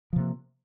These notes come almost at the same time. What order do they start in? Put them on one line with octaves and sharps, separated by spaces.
F3 C3 A#3